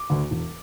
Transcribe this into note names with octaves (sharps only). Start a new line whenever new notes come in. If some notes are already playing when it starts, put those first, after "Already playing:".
Already playing: D6
D2 D3
E1